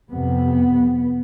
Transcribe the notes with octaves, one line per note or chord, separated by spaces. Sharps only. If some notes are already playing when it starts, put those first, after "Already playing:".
F2 C3 B3